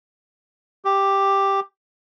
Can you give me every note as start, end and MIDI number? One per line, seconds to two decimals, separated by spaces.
0.85 1.60 67